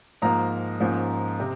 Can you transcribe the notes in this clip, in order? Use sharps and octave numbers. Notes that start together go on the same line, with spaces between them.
G#2 F3 A#3 A#5
G#2 F3 A#3 C#4
C3